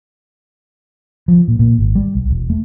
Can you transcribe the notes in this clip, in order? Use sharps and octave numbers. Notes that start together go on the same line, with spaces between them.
F3
A#2
A#2
G#1
G3
B1
E1
A3